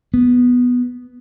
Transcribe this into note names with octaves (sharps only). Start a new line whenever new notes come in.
B3